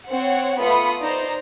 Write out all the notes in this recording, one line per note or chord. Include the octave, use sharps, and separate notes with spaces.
C4 C#5 F#5
A3 B3 F4 B5 D#6 C#7
D#4 C5 D5 A#5